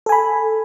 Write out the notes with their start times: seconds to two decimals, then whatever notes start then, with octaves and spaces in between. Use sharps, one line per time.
0.06 A4
0.09 G#5
0.12 B5